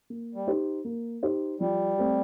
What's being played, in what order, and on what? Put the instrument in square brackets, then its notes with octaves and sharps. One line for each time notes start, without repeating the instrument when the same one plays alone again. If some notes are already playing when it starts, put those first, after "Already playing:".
[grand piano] A#3
[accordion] G3
[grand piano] D#4 G4 C5
A#3
D#4 G4 C5
[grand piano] F3 [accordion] G3
[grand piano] A3 C4 G4